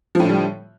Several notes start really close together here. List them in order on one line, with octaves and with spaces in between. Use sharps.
F3 A2 D3 G3